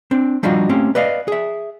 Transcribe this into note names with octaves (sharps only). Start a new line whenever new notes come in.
C4 D4
F3 G3 D4 D#4 F4 F#4
A3 A#3 C4 C#4 G4
B4 D5 D#5 F5
G#4 E5